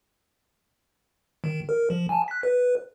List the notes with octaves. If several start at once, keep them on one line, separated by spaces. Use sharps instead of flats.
D#3
A#4
F3
G#5 A5
F#6 B6
B4